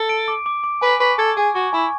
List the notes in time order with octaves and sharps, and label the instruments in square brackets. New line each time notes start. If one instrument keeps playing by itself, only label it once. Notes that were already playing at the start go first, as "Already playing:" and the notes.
Already playing: [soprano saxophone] A4
[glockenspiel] D7
D6
D6
D6
[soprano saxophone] B4 [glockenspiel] G#5
[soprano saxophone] B4 [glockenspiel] C#6
[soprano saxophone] A4 [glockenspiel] G#6
[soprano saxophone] G#4 [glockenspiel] G#5
[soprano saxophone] F#4 [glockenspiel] C#6
[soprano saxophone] E4 [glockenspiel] G#5